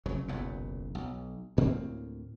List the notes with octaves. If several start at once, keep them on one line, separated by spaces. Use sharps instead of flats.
F1 C#3 F#3
F#1 B1 E2 A#2
B1
D2 A2 A#3 C4